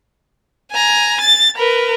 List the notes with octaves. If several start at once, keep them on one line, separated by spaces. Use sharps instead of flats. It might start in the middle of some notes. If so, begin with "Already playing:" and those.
G#5 A#5
A6
A#4 B4